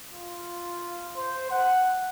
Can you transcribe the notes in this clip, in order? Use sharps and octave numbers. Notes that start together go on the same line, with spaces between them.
F4
C5
F#5